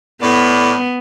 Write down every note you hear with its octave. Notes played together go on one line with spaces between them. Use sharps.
A2 B3 D5